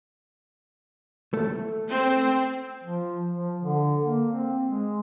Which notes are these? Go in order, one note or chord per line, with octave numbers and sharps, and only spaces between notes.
A3
C4
F3
F3
D3
A#3
C4
G#3